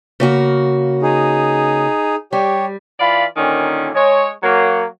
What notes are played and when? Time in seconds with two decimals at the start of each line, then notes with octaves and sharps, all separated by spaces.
0.20 C#3 A#3 F#4
1.02 D#4 G#4
2.33 G3 G4 C#5
2.99 E3 F4 D5 F5 B5
3.36 A#2 D3 D#3 C#4
3.94 G#3 C#5
4.43 F#3 A#3